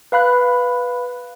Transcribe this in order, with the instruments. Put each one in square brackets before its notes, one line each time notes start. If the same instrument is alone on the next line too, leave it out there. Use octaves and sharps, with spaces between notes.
[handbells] B4 F5 B5 F#6